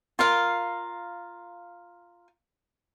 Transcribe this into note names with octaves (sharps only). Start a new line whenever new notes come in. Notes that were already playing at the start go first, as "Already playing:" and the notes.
F4 A#4 F5